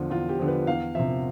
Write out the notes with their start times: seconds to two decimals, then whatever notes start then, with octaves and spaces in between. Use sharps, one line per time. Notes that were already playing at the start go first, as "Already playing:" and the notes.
Already playing: E2 D3 F3 F4
0.10 E2 F4
0.29 G4
0.39 D3 F3
0.48 B4
0.67 E2 F5
0.95 C3 F3 E5